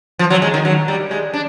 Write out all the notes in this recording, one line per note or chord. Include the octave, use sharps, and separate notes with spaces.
F3
F#3
G#3
D#3
F#3
G3
G#3
D4